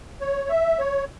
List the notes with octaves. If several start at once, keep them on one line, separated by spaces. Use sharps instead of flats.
C#5
E5
C#5